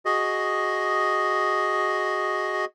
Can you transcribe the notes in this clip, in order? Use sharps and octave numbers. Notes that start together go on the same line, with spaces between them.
F#4 G#4 D#5